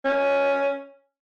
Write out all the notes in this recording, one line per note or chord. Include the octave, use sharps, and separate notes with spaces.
C#4